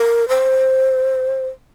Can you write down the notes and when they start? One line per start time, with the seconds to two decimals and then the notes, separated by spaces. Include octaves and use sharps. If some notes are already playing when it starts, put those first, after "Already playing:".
Already playing: A#4
0.29 C5